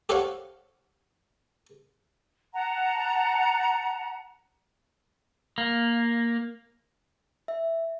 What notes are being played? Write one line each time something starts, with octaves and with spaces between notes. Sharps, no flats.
G4 A4 C5 C#5 F5 F#5
F#5 A5 A#5
A#3
E5